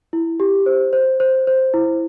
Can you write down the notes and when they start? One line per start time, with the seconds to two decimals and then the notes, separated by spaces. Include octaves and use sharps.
0.13 E4
0.40 G4
0.66 C5
0.93 C5
1.20 C5
1.47 C5
1.74 E4